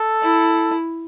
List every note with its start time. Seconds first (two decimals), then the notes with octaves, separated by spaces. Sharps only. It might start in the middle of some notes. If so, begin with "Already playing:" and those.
Already playing: A4
0.23 E4